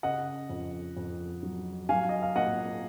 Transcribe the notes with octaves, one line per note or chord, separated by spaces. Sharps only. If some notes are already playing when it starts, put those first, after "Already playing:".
C#3 D#5 F#5
F2
F2
F#3
F#3 F5 G#5
D#5
F5
A#2 D#5 F#5